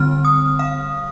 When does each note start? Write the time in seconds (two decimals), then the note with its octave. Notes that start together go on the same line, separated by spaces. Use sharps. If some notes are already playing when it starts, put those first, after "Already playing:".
Already playing: D3 G3 C4 F6
0.25 D#6
0.59 F5